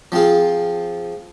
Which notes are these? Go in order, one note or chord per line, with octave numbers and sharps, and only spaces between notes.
F3 C4 F4 G#4